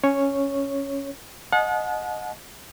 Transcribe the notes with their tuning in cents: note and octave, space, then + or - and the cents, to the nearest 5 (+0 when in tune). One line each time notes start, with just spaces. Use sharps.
C#4 +0 C#5 +0
D#5 +0 F#5 -35 A5 -40